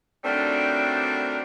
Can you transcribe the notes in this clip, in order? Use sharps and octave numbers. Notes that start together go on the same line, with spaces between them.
D#3 F#3 G3 A3 C4 D4